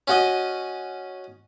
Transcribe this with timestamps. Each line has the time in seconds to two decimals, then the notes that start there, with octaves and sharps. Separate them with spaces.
0.08 C#4 F#4 D#5